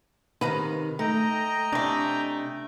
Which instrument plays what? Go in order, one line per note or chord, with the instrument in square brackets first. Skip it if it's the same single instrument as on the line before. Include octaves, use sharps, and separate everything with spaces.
[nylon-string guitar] C3 D#3 [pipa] B4 F5 A#5
[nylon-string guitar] A3 [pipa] D#4 [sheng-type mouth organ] D#5 G5 A#5
[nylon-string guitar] C3 [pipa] E3 A3 [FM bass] D4